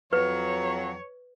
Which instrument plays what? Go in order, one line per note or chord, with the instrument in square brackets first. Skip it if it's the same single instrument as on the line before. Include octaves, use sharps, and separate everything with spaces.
[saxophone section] F2 F#3 [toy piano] B4 [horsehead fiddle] C#5